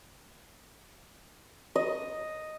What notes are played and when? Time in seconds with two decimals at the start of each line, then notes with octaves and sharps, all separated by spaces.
1.75 D#5